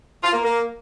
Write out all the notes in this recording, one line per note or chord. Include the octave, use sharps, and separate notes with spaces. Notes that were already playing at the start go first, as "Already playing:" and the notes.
F4
A#3
A#3